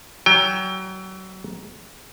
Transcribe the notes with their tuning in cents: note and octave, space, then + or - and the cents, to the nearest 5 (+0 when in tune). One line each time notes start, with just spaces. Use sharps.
F#3 +30 G5 +25